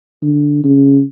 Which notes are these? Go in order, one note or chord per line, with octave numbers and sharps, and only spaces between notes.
D3
C#3